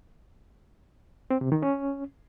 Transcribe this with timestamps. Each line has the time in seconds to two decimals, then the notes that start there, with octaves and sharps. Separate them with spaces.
1.31 C4
1.41 C3
1.52 D#3
1.62 C#4